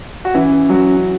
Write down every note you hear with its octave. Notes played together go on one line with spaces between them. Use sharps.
F#4
E3 C#4 E4
F#3 F#4